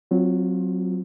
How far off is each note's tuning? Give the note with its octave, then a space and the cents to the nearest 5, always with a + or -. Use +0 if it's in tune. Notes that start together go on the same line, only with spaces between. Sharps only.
F#3 +0 C4 +0 F4 +20